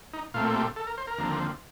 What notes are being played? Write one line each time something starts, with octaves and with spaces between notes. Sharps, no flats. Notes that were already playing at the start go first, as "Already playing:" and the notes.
D#4
A#2 A3 C4 F4
G4
A4
A#4
C5
A#4
D#2 D3 F3 C4